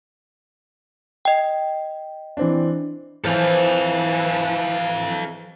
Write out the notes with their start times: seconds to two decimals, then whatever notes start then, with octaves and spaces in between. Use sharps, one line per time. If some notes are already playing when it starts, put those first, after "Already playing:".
1.25 D#5 G5
2.37 E3 C4 D4
3.24 E3 F3 A4 F5 A5